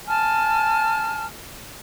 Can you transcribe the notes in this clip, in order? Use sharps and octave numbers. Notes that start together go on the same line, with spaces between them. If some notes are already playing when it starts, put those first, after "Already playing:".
G#5 A5 F6